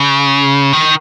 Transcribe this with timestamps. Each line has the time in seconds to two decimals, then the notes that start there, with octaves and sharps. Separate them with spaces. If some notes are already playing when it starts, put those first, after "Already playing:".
Already playing: C#3
0.73 D#3